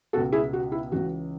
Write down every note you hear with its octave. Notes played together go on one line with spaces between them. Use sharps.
C#2 B2 F#4 A4
E4 G#4
F#4
E4
C#2 C#3 E3 F#4